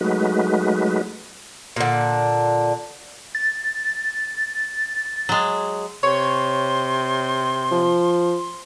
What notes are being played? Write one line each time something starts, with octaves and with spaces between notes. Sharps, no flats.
F#3 G#3 A3 D#4 F#4 B4
A#2 D3
A6
F#3 G#3
C3 C#5 C6
F3